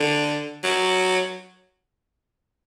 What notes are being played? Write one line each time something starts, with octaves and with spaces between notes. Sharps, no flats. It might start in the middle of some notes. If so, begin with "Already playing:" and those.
Already playing: D3
F#3